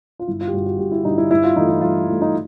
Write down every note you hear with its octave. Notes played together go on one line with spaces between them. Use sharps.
F4
G1 E4
F4
G4
G2 D3 F#4
F#4
G1 G4
E4
G2 D3 D#4
E4
G2 E4
F4
E3 A3 D#4
E4
G2 F4
E3 A3
D#4